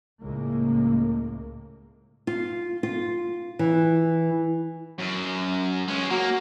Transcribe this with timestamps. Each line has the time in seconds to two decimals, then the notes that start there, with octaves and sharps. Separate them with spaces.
0.21 C#2 A2 A#3
2.27 F4
2.83 F4
3.59 E3
4.98 F#2
5.88 G#3 C#4
6.10 F#3 A#3